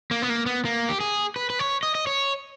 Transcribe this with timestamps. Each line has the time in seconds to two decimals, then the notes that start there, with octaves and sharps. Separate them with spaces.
0.11 A#3
0.22 B3
0.30 A#3
0.46 B3
0.65 A#3
0.89 G4
1.00 G#4
1.36 B4
1.50 B4
1.59 C#5
1.83 D#5
1.95 D#5
2.07 C#5